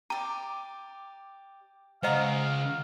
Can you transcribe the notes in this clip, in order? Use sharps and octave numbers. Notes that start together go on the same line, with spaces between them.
G4 D5 A#5
C#3 G#3 C5 D#5 F5 F#5 A#5 D#6